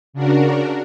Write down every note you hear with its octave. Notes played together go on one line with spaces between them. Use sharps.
C#3 D4 F#4 A#4